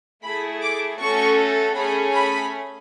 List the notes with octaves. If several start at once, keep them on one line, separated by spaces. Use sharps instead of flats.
A3 E4 G#4 B5
D6
A3 C#4 F#4 A4 C#6
A3 C#4 G#4 B5
B5